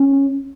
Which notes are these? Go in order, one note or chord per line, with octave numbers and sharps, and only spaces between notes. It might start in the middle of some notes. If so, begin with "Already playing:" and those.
Already playing: C#4